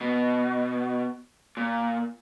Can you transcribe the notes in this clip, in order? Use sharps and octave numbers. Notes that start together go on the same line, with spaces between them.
B2
A#2